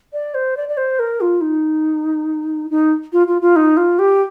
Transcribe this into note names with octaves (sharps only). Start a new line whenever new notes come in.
D5
C5
D5
D5
C5
A#4
F4
D#4
D#4
F4
F4
F4
D#4
F4
G4